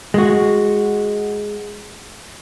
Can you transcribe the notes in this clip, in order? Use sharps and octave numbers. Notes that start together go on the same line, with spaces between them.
G#3 F#4